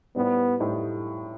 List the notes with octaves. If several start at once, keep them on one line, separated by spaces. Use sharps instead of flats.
A2 G3 B3 D#4 G4 C5
A2 G3 D#4 G4 C5